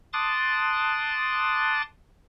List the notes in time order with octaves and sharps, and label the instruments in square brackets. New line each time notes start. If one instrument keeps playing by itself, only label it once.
[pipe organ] A5 C6 D6 D#6 F#6 A6